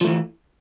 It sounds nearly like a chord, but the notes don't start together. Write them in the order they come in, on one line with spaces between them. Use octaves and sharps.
F3 A3 E3